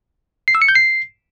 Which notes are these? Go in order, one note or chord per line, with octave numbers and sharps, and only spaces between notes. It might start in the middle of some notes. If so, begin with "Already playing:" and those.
C7
E6
C#7
G6
C7